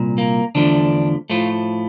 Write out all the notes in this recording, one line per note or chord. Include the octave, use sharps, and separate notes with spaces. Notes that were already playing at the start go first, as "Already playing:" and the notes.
Already playing: C2 A#2
A#3
E2 D3 F3 A3 D4
A2 F3 A3 F4